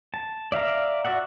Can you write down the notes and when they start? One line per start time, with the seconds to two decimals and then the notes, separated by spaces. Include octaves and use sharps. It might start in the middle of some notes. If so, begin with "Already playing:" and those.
0.14 A5
0.52 D5 E5 F5 A#5
1.05 F#4 D5 E5 F#5